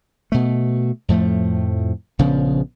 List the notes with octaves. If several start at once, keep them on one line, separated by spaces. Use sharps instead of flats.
B2 A3
F2 A2 F3 A3
A#1 C#3 F3 B3